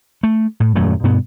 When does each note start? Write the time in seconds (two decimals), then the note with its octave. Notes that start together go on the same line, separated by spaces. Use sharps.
0.23 A3
0.60 A2
0.76 D#1 F#2 F#3 A3
1.04 G2 B2 B3